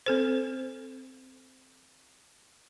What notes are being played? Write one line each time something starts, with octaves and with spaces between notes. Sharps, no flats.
C4 A4 C5